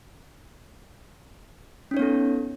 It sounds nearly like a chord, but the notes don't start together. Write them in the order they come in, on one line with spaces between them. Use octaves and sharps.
C#4 D#4 C#5 B3 A4